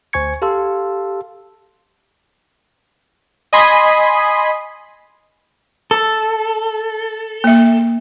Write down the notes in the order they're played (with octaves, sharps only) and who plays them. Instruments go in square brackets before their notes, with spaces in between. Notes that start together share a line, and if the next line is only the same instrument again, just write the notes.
[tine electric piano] D2 C5 G#5 C#6 G#6 C#7
G4 A4 F5 A5 C6 E6
[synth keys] D#5 G#5 B5 C6 D#6
[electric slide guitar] A4
[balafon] A#3 E5